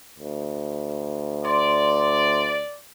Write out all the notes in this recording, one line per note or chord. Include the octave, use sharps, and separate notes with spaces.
D2
D5 C6